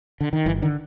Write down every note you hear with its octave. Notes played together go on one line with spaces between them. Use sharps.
D3
D#3
G1 E3
D3 D#3